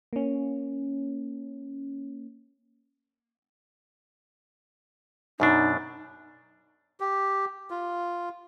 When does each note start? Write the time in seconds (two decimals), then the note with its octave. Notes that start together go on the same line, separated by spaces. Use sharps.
0.13 A#3 C#4
5.40 F#2 B2 D4 D#4
7.00 G4
7.70 F4